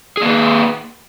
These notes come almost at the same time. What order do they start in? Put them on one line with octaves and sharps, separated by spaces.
G#4 A#3 B4